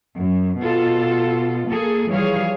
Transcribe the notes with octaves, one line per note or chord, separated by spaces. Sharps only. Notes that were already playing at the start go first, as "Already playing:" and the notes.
F#2
B2 F4 A4
A#3 G#4 A4
E3 F3 G3 G#4 C#5 F5